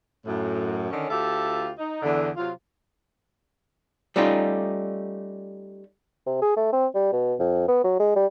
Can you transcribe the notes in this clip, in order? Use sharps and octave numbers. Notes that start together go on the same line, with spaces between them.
F#2 A2
D3 D#3 C#4
D2 F4 G4 A4 E5
D#4
E2 D3
C3 F#3 F4
G3 A3 C#4 D#4 F4 G4
C3
G#4
A3
C4
G3
B2
F2
B3
F#3
G#3
G3